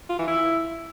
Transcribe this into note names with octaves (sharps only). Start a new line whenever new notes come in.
F4
E3
E4